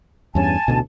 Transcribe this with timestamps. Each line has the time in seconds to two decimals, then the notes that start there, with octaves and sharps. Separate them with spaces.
0.35 E2 G2 C#4 G#5 A5
0.68 A1 D2 B2